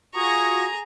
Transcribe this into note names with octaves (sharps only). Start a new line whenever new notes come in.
F4 F#4 G#4 A#5 C#6 D#6 G#6 A#6